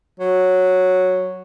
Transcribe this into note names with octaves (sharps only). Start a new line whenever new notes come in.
F#3